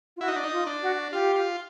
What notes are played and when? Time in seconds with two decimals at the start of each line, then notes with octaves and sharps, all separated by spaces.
0.17 F4
0.21 E4 F#4
0.28 D#4
0.36 D4
0.44 D#4
0.52 F4
0.67 D4
0.82 F#4
1.12 F4 G4
1.36 F4